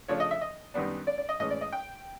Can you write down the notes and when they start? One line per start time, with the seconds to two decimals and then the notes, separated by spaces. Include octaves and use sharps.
0.08 C#3 F3 A3 D4 C#5
0.20 D#5
0.31 E5
0.41 D#5
0.74 F#2 D#3 G3 B3 D4
1.07 D5
1.18 D5
1.29 D#5
1.40 A2 E3 G#3 C#4 D#5
1.51 D5
1.61 D#5
1.73 G5